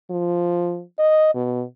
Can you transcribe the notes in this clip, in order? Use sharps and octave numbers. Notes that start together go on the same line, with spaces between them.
F3
D#5
B2